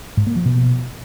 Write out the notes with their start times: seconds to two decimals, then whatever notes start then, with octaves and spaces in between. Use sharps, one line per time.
0.17 G#2
0.27 A#3
0.36 F3
0.45 B2